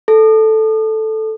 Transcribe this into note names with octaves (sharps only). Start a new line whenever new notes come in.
A4